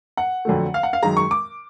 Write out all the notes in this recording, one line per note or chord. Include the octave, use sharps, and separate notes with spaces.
F#5
F2 D3 F#3 A3
F5
F#5
F5
F#2 D#3 G#3 A#5
C#6
D6